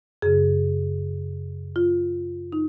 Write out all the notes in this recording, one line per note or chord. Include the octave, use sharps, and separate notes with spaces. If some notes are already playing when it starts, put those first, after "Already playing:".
F#2 C#3 G#4
F4
D#4